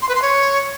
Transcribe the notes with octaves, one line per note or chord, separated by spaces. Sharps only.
C6
B4
C6
C#5